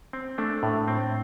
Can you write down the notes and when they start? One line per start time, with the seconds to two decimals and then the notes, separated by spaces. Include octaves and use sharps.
0.13 C4
0.38 A3 D4
0.63 A2
0.88 C4